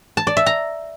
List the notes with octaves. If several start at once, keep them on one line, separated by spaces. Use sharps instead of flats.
A5
D5
E5
A#5